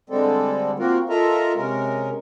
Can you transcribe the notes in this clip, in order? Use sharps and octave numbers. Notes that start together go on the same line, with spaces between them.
D3 G3 G#3 C4 A4
A#3 C4 F4 F#4 A#4
F4 A4 A#4 D#5 E5 A#5
C3 G#3 C#4 A#4